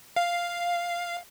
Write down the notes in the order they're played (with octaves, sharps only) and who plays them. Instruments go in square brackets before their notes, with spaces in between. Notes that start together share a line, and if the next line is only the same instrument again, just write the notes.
[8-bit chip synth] F5